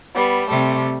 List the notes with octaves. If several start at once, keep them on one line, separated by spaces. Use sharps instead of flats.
G3 B3
C3 G3 A3